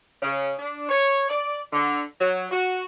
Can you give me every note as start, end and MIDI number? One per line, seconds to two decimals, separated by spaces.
0.22 0.52 49
0.59 0.86 62
0.89 1.26 73
1.29 1.58 74
1.72 2.02 50
2.20 2.47 54
2.51 2.84 66